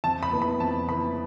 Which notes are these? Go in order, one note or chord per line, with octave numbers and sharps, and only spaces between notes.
F2 A5
B5
E3 B3
B5
F2 A5
E3 B3 B5